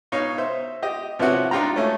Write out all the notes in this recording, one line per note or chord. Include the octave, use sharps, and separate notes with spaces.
B2 D#4 C#5 F5
C5 E5
G4 D#5
C3 F3 B3 C#4 E4 F#4
D4 D#4 F4 G4 A#5
A3 C#4